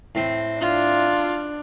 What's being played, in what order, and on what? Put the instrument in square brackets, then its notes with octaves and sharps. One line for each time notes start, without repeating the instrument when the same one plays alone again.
[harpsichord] A2 C4
[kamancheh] D4 [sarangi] F4